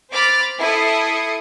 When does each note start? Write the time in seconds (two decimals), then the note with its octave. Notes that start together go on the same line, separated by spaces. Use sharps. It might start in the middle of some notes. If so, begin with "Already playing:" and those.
0.12 C5 B5 D6 F6 A6
0.60 E4 A4 D#6 C7 C#7